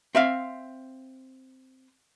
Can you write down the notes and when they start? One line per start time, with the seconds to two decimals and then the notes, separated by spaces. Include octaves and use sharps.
0.15 C4 E5 F5